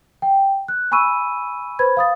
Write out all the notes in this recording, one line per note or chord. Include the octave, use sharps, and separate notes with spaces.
G5
F#6
G#5 B5 C#6 E6 D#7
B4 C5 B5 G#6
F5 D#6 A6